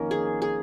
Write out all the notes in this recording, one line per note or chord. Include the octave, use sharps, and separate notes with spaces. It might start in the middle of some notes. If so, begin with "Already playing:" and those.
Already playing: F2 D#3 A#3 C#4 A#4
G#4
G#4